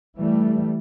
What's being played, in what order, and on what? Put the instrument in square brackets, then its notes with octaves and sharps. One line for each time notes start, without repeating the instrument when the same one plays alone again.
[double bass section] E3 G3 A3